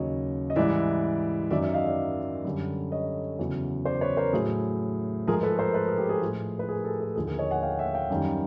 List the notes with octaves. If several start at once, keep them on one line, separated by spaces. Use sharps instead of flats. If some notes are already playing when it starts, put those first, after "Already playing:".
Already playing: D#2 C#3 F#3 C#5 D#5
D#5
G#2 E3 G3 D5 E5
F#2 D#3 F#3 D5 E5
D5 E5
D#5 F5
D5 E5
F#2 D3 G3
C#5 D#5
E2 C#3 F#3
C5 D5
B4 C#5
A#4 C5
A2 F#3 G#4
G#2 F3 G#4 A#4
A4 B4
A#4 C5
A4 B4
G#4 A#4
G4 A4
G#4
A2 F3
B4
G#4 A#4
G4 A4
G#4
D#2 D3 F3 G#4
G#4 A#4
C#5 D#5
F#5 G#5
F5 G5
E5 F#5
F5 G5
F#2 D#3 G3